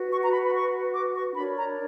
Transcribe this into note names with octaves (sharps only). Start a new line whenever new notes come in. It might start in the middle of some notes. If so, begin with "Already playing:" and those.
Already playing: F#4 B4
C#6
A#5
B5
B5
C#6
D6
C#6
D4 A#4 C#5 B5
A#5